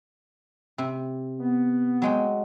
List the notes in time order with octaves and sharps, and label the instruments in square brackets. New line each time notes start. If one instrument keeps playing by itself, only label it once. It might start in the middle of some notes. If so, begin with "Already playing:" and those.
[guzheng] C3
[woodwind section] B3
[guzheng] F#3 G#3 G5